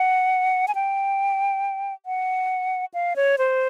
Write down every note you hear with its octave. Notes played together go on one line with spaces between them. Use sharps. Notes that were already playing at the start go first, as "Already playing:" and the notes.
Already playing: F#5
G#5
G5
F#5
F5
C#5
C5